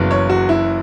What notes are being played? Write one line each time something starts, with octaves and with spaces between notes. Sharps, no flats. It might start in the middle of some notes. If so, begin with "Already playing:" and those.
Already playing: F#1 F#2 C#3 E3 B3
C#5
F#4
E4